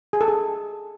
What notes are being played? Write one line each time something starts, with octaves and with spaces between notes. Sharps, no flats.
G#4
A4
G#4